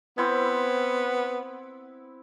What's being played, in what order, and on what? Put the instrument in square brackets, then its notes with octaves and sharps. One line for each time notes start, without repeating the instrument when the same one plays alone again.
[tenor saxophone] B3 [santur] C4 E4